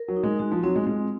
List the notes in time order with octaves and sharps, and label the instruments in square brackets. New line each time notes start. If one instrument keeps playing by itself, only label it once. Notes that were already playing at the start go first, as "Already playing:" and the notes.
Already playing: [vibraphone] A#4
[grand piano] F#3
[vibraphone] D#4
[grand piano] G#3
[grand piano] G#3 [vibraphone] F#4
[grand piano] F3
[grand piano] F#3 [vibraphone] C4
[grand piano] G#3
[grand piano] G#3 [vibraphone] F4